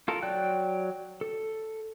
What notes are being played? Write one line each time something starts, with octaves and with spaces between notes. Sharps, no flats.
F4 A4 A#4
F#3 D5 G5 F#6
A4